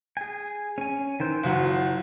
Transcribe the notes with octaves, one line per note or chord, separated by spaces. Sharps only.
G#4 G#5
C#4 G#5
D#3 E3 C5
F#1 F#3 F4 F#5